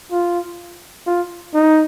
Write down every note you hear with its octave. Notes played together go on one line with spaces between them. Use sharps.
F4
F4
D#4